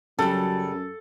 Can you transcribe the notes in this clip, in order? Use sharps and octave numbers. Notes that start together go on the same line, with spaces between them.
F#2 C#3 F#3 G3 A4